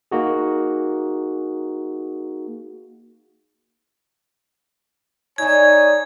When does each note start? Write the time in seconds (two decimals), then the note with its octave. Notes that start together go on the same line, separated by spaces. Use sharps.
0.11 A#3 D#4 F#4 G#4
5.38 D4 D#4 A4 C#5 G#5 G#6